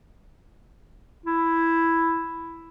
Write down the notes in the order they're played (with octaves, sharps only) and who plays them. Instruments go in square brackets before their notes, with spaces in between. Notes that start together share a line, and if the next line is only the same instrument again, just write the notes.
[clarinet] E4